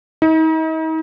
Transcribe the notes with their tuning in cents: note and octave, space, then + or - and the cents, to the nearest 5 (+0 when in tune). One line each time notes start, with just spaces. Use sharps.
D#4 +40